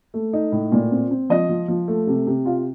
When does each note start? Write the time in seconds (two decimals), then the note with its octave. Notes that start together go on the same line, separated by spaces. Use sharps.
0.14 A3
0.33 D#4
0.52 A2
0.72 A#2
0.91 C4
1.11 C4
1.30 F3 D#5
1.49 F3
1.68 F3
1.88 A3
2.07 C3
2.27 C3
2.45 F4 F5